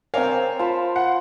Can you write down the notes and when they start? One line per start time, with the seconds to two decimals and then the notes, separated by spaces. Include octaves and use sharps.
0.14 C4 A#4 C#5 D5 F5 G#5
0.59 F4 C5 A5 B5
0.96 F#5